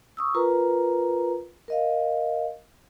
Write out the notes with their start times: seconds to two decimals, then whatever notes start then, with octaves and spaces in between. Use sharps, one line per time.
0.17 C#6 D#6 E6
0.34 F4 A#4 B4 A#5
1.68 A#4 D#5 F5